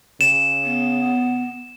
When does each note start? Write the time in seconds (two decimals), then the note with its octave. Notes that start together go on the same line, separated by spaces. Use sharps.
0.21 C#3 E7
0.64 B3